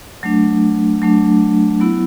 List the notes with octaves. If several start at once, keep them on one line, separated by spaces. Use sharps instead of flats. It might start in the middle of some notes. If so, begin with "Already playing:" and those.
F#3 A3 D4
F#3 A3 D4
F#3 B3 E4